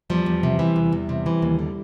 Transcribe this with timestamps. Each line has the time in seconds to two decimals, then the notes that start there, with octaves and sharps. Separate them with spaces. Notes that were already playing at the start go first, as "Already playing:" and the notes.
0.10 E2 F3 G3
0.26 E2
0.43 C3
0.59 E3
0.76 E2
0.93 E2
1.09 C3
1.26 E3
1.42 D#2
1.59 D3